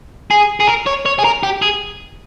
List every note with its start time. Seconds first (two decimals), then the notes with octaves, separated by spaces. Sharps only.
0.31 G#4
0.60 G#4
0.68 A#4
0.87 C#5
1.06 C#5
1.19 G#4
1.24 A#4
1.43 G4
1.62 G#4